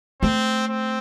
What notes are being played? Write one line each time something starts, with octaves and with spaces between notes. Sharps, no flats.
A3 C4
C4